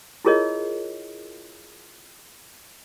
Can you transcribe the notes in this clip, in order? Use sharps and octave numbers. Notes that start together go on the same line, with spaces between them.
E4 F4 G#4 A#4 C#5 D#5